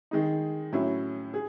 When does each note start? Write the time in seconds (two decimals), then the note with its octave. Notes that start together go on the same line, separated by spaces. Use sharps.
0.11 D#3 G#3 D#4
0.72 A2 F#3 C#4 E4
1.34 G#4